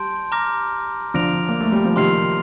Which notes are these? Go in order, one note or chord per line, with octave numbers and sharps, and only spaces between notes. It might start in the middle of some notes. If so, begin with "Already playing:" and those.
Already playing: G3 A5 C6 G6 D7
A#5 D6 F6 A#6
D3 F3 F6 A#6 D7 F7
A#3
A3
G3
F3
C3 D#3 C6 F6 C7 F7